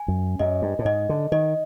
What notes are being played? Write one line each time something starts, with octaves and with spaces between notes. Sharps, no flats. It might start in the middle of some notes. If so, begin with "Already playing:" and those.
Already playing: G#5
F#2
F#2 D#5
G2
A2
G#2 D#5
D3
D#3 D#5